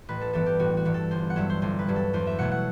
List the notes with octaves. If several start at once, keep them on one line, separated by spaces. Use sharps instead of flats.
A1 B4
A4
G2 E3 B3 A4
G4
A1 F#4
F#4
G2 E3 B3
A4
G1 C5
F#5
G2 F#3 E5
C5
G1 C5
B4
G2 F#3
A4
E2 C5
E5
B2 F#3 A3 F#5
F#5